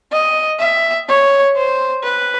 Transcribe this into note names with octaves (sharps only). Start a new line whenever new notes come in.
D#5
E5
C#5
C5
B4